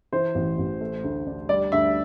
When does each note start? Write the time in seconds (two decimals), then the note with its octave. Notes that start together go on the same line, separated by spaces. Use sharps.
0.12 E3 C5
0.35 A1
0.58 A1
0.81 A3
1.03 D2
1.27 D4
1.49 G3 D5
1.72 D2 E5